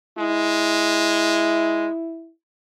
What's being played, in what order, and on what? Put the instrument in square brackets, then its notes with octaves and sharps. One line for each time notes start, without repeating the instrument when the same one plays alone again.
[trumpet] G#3 [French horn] E4